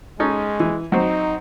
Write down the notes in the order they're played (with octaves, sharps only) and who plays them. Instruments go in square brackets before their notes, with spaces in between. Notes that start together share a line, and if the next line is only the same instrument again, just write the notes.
[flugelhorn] G#3 [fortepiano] C#4 D#4 A4
[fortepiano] E3
[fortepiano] F#3 C4 [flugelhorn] D#4